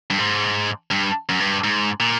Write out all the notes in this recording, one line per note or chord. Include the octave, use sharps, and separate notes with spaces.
G2
G#2
G2
F#2
G2
G#2
A#2